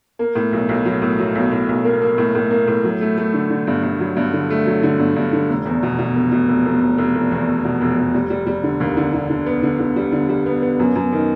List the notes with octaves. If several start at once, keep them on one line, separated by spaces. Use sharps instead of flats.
A#3
A2
B1
B1
F#3
A2
F#3
B1
A2
B1
A#3
A#3
A2
A2
A#3
A2
F#3
A3
A3
D3
D3
G2
G2
F#3
G2
D3
A3
F#3
D3
G2
G2
D3
F1
E2
B2
B2
F1
B2
F1
F1
F1
F1
F1
E2
F1
B2
F1
F1
G3
G3
G3
D3
D#2
D3
D3
D3
B3
D3
D3
G3
D3
G3
B3
B3
F#2
F#2
D#3